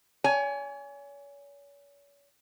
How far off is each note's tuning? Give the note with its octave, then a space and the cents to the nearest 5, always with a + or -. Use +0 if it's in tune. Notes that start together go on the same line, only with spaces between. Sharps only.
C#5 +40 G#5 +0